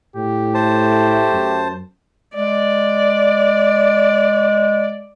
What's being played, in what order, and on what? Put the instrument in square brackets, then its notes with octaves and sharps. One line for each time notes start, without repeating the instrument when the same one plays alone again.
[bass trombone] A2 [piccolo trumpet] G4
[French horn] A3 [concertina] C5 A5
[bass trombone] F#2
[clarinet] G#3 [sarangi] D5